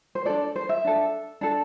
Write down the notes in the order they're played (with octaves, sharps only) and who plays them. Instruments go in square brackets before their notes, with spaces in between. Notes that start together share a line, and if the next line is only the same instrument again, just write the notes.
[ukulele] C5
D4 A4 D5
C5
E5
D4 A4
D4 A4